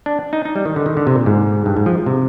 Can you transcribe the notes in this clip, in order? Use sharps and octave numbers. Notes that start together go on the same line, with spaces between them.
D4
D#4
D#4
G3
D#3
D3
D#3
D3
C3
A#2
G#2
G2
G#2
F3
C3